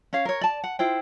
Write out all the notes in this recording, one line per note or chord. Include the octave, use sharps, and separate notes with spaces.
C#4 C#5 F5
A#4 C#5
D5 A5
F#5
E4 F4 C5 G5